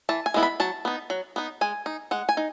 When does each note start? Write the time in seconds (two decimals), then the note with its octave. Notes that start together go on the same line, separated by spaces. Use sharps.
0.09 E3 A5
0.26 G#5
0.34 G#3 B3 E4
0.43 B5
0.60 F#3 A5
0.85 B3 D#4
1.10 F#3
1.36 B3 D#4
1.61 G#3 G#5
1.86 D#4
2.11 G#3 F#5
2.29 G#5
2.37 D#4